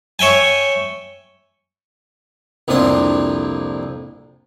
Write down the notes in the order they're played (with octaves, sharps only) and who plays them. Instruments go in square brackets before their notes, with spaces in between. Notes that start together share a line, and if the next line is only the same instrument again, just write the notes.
[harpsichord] C#5 E5 G5 G#5
C2 F2 A#2 D4 C5